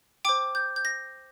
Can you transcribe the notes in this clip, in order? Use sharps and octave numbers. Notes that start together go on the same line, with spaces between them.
C5 G5 D6
G6
G6
A#6